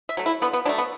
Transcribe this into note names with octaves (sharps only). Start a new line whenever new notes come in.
E5
F#3 A3
E4
D3 B3
B3
F#3 A3 D4
B3